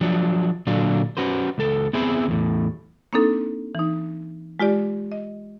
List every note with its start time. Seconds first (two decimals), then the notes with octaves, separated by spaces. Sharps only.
0.01 F3 F#3 D4
0.67 A#2 D3 F#3 D4 F4
1.17 C#4 F#4 B4 C5
1.58 C#2 A4
1.93 B3 C4 E4 G#4 C5
2.28 E2 A2
3.13 A#3 C4 D4 D#4 A4
3.75 E3 D#4
4.59 G#3 F4 G4 D5
5.12 D#5